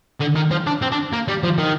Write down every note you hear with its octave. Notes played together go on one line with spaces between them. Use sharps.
D3
D#3
F3
D4
C4
D4
A#3
G3
F3
D#3